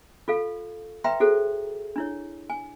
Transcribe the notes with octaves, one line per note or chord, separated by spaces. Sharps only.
F4 A4 F5
B4 E5 G5 A#5 C6
F#4 G#4 A4 C5
D4 E4 C#5
G#5